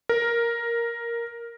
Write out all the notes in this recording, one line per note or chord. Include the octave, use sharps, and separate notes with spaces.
A#4